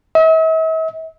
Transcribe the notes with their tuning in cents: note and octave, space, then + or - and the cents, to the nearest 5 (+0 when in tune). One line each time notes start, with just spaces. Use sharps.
E5 -45